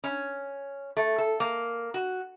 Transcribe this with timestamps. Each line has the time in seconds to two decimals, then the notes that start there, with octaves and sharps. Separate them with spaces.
0.04 C#4
0.97 A3
1.18 A4
1.40 A#3
1.94 F#4